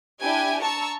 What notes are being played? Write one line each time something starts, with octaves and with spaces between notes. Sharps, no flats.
D4 E4 G4 G5 G#5
A5 A#5 C#6 E6